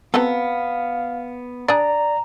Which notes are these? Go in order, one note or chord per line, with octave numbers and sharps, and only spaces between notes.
B3 C4 F#4 A4 F5 A#5
D4 G#4 D5 A#5